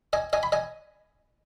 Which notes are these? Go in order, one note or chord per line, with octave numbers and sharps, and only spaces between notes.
D#5 G#5
D#5 G#5
B5
D#5 G#5